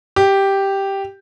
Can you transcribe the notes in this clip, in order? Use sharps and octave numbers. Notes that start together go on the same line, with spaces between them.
G4